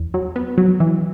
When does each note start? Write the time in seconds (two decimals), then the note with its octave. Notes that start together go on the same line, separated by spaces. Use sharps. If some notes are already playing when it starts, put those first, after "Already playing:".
Already playing: E2
0.14 F#3
0.36 B3
0.58 F#3
0.80 E3